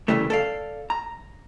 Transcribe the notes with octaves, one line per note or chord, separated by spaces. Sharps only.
C2 F#2 C#3 E3 G3 A3
A4 D5 F5
A#5